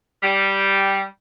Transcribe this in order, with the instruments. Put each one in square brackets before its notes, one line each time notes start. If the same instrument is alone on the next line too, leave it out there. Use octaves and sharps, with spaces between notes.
[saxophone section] G3